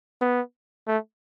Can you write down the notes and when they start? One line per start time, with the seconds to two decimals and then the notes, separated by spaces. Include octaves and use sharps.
0.21 B3
0.87 A3